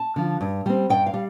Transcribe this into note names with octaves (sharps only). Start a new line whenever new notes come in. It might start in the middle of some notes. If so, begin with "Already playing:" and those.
Already playing: A5
D3 F3
G2
G3 C4
G2 G5
F5
G3